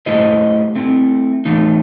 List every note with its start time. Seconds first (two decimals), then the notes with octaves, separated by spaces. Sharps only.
0.06 A3 E4 G4 C5 D#5
0.75 A3 C4 E4
1.45 E3 A3 D#4